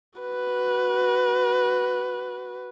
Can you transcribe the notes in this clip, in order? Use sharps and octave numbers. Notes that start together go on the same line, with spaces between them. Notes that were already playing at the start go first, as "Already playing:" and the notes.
F#4 B4